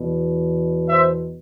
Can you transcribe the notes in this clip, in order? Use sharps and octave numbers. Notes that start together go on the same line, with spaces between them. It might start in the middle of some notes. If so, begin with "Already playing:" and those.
Already playing: E2 B2
C5 E5